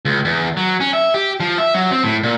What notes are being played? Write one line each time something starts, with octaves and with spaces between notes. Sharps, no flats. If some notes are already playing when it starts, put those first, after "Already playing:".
C#2
E2
F#3
C#4
E5
G4
F3
E5
F#3
C4
A2
A#2